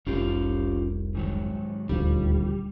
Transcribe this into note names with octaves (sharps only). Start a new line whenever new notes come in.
F1 C2 C#4 F4 G4
G#2 D#3 F#3
D#1 D2 F3 G3